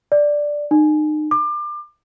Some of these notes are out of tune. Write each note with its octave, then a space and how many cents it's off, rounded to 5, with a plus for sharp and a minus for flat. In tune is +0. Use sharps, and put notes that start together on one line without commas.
D5 +0
D#4 -35
D6 +30